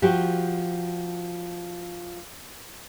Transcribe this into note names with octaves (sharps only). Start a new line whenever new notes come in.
F3 F#4 G4